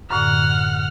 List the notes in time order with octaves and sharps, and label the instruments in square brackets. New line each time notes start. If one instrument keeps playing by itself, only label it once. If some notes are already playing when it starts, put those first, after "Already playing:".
[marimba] F#2 A2 D3 [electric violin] F#5 F6